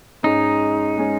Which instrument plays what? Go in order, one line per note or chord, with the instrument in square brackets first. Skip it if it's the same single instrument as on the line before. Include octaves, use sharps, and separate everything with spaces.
[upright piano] G#2 G#3 C#4 [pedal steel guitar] D#4
[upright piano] G#3 C#4